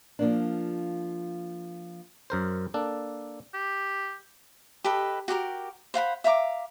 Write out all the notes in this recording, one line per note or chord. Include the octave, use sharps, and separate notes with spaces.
F3 A#3 D4
F#2 A#4 C5
A#3 D4 A4
G4
G4 A4 B4 D#5
F#4 G4 A4 A#4
C5 F5 F#5 B5
E5 F5 A#5 D6